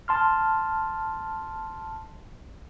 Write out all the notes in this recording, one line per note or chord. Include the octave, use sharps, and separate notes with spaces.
A5 C6 F6